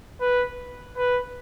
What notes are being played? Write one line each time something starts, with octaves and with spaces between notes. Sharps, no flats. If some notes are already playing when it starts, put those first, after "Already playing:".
B4
B4